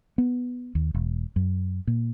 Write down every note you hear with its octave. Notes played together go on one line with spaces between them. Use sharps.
B3
D#2
E1
F#2
A#2